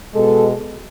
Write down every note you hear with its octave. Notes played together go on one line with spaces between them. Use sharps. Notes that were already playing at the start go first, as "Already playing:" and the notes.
B2 G#3 A4